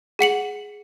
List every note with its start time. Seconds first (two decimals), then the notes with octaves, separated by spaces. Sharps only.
0.19 G#4 F#5 C#7 F#7